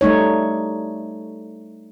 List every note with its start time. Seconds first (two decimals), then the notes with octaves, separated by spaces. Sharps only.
0.01 G3 A3 D#4 C#5